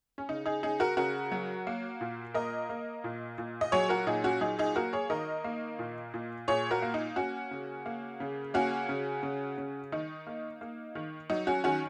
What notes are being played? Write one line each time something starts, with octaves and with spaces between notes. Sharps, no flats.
C#4
C#3 D#4
D#4 G#4
C#3 D#4 G#4
F#4 A#4
C#3 F#4 A#4
F#3
A#3
A#2
A#3 A#4 D#5
A#3
A#2
A#2
D#5
F#3 G#4 C#5
F#4 A#4
A#2 D#4 G#4
C#4 F#4
F#3 D#4 G#4
D#4 G#4
A#3 F#4 A#4
G#4 C#5
D#3 A#4 D#5
A#3
A#2
A#2
A#2 G#4 C#5
F#4 A#4
A#3
D#4
A#3 C#4 F#4
C#3
A#3
C#3
A#3 C#4 F#4
C#3
C#3
C#3
D#3 D#4
A#3
A#3
D#3
F#3 D#4
C#4 F#4
D#3 C#4 F#4